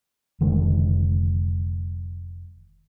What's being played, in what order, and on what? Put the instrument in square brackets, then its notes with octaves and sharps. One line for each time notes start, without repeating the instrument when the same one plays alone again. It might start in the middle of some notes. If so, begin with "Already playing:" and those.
[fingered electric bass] F1 D3 D#3 G#3